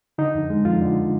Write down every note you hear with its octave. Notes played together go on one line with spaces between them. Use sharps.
D3 D#4
F2
G#3
F2 F4
D3